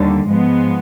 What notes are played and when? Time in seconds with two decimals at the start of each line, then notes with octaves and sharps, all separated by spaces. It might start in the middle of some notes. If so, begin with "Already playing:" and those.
Already playing: D#2 D3 G3
0.27 G#2 F3 G#3 B3